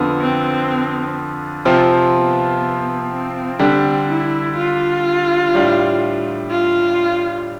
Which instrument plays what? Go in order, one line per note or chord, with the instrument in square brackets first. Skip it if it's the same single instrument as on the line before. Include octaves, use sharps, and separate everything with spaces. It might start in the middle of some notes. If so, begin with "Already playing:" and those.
Already playing: [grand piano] F2 D3 F3 B3
[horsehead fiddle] C4
[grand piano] C3 F3 C4 F4
[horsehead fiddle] B3
C4
[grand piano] D3 G3 D4 G4
[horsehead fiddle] E4
F4
[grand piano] A2 G3 D4
[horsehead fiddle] F4